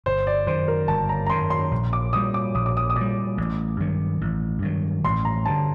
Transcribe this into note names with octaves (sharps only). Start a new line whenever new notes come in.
G1 C5
D5
F#2 D#3 C5
A#4
G1 A5
A#5
A#5
F#2 D#3 C6
C6
A#1
D6
A#2 G3 D#6
D6
A#1 D#6
D6
D#6
D#6
A#2 D6
G3
A1
G2 D#3 F#3
A1
G2 D#3 F#3
A1 C6
A#5
G2 D3 A5